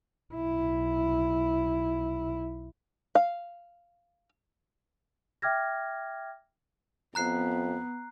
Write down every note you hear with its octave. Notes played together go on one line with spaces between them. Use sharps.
B1 E4
F5
E5 G5 D6 F6 G#6 A#6
F2 B3 A#5 F#6 C7